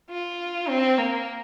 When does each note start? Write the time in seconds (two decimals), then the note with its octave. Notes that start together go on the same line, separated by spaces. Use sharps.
0.10 F4
0.69 C4
0.98 A#3